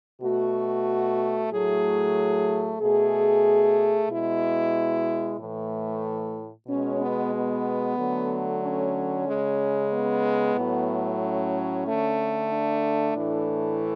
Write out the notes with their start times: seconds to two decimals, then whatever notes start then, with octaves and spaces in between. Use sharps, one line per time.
0.22 B2 A3 F#4
1.52 A2 F#3 A3 G#4
2.81 B2 A3 G#4
4.09 B2 G#3 E4
5.40 A2 E3 A3
6.68 B2 G#3 C#4
7.01 B3
7.34 B3
7.98 D3 F#3 A3
8.63 C#4
9.27 C#3 G#3
9.92 B3
10.56 A2 F#3 A3
11.21 C#4
11.86 D3 A3
12.50 D4
13.14 A2 E3 A3